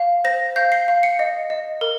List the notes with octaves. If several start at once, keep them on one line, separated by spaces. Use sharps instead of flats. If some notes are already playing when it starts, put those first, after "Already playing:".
Already playing: F5
C5 A#6
F5 G6
C7
F5
C#7
D#5
D#5
A#4